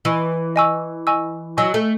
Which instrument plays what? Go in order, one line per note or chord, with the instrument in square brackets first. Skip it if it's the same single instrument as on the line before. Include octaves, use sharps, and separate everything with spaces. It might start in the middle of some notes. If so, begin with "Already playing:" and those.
[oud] E3 [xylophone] D#5 G#5 C#6 E6
[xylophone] D#5 G#5 C#6 E6
D#5 G#5 C#6 E6
[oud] F#3 [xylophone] D#5 G#5 C#6 E6
[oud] A3